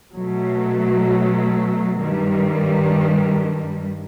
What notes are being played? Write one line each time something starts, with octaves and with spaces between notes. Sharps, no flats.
B2 F#3 A3
G2 D#3 G3